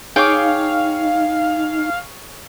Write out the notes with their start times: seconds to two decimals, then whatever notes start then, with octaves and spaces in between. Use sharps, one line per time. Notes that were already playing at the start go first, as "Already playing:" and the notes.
0.16 D#4 G#4 C#5 F5 G5 C#6 D6